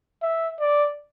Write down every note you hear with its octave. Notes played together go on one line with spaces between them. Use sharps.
E5
D5